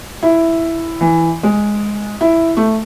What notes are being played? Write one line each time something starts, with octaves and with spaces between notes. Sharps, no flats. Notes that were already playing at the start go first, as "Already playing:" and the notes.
E4
E3
G#3
E4
A3